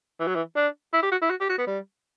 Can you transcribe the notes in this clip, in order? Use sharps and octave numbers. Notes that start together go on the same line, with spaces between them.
E3
F#3
E3
D4
E4
G4
F#4
E4
F#4
G4
F#4
B3
G3